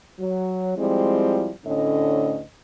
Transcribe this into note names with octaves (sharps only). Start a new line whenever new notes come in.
F#3
F3 G3 G#3 C4 E4
D2 A2 D3 C#4 D#5